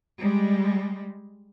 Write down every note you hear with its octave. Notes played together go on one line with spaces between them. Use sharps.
G3 G#3